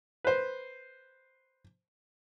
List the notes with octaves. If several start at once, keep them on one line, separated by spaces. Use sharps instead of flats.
B4 C5